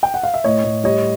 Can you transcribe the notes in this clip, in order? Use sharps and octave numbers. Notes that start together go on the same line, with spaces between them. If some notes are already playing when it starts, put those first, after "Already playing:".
G5
F#5
F5
E5
A2 C#5 D#5
A2
G3 C#5 D#5